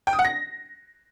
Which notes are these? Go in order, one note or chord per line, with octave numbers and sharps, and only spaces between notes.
G5
D#6
F#5
A#6